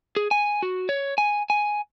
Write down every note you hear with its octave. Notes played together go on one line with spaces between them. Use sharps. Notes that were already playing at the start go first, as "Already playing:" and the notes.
G#4
G#5
F#4
C#5
G#5
G#5